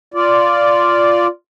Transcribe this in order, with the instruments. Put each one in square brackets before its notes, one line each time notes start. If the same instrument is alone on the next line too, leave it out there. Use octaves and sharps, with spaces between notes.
[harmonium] F4 D5